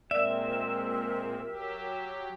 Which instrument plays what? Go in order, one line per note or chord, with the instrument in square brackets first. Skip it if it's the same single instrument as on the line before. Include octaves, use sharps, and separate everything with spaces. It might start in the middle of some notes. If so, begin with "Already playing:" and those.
[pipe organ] A#2 G#3 C4 [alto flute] A#4 [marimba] D5 [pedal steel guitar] E5
[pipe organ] F#3 G4